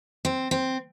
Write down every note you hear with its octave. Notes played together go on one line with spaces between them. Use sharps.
C4
C4